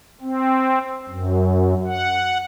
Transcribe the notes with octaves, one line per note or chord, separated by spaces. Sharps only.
C4
F#2
F#5